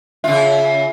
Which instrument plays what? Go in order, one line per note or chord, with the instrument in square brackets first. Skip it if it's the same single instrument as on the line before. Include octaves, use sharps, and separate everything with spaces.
[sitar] C#3 F4 [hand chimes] E5